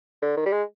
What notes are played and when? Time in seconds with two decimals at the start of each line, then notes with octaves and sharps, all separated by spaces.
0.22 D3
0.37 D#3
0.46 G3
0.52 G#3